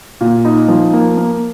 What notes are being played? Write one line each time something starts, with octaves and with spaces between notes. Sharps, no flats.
A#2
D#4
F3
A#3
A#3